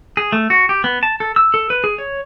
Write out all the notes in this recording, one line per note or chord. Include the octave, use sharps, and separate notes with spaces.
G#4
A3
F#4
G4
B3
A5
A4
E6
A4
B4
G#4
C#5